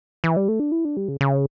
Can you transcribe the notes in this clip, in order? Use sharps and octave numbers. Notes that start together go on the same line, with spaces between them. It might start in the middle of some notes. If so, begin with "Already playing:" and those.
E3
G3
A3
D4
E4
D4
G3
C#3
C#3